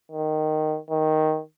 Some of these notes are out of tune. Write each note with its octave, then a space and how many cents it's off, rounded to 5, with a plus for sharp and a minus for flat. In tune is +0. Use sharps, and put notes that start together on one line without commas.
D#3 -10
D#3 +5